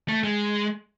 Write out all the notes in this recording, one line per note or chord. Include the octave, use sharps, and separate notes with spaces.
A3
G#3